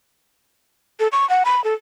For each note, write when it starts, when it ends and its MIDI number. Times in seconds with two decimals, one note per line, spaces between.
1.00 1.08 69
1.12 1.28 85
1.30 1.43 78
1.45 1.63 83
1.64 1.73 69